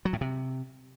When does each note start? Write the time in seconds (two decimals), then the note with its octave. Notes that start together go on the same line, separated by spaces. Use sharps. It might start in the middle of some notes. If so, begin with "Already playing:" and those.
0.05 F#3
0.13 A2
0.21 C3